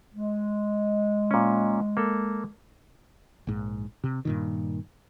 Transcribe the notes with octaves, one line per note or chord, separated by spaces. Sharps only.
G#3
A#2 C#4
A#3 A4
A#1 G#2
C3
G2 A#2 D#3